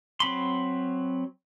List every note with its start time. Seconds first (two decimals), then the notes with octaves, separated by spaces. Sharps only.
0.20 F#3 C4 B5 C6